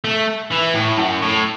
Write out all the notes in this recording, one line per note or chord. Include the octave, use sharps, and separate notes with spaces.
A3
E3
A2
F#2
A2